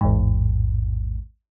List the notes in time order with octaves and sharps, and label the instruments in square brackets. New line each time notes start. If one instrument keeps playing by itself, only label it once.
[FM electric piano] A1 E2 G#2